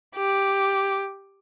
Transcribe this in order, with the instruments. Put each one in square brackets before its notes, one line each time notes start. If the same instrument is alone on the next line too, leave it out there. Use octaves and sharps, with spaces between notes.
[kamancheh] G4